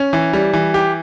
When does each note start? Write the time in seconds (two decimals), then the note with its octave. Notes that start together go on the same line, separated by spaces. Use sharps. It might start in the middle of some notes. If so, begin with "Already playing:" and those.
Already playing: C#4
0.13 E3
0.33 G3
0.53 E3
0.74 G4